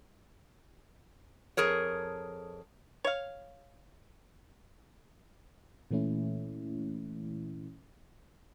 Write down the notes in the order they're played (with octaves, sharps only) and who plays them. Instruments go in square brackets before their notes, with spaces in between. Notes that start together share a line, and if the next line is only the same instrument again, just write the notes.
[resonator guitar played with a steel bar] F2 G#4 A#4 C#5
[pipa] C#5 F5
[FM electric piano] A#2 E3 A3 C#4 E4